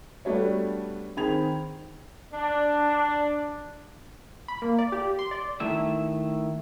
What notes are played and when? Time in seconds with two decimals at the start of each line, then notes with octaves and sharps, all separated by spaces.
0.25 G3 A3 B3 D4 F#4 C#5
1.17 D#3 C4 G#4 B5 G#6 F7
2.34 D4
4.48 B5
4.62 A#3
4.79 D5
4.92 G4
5.19 C6
5.31 D5
5.60 D#3 A3 E4 E5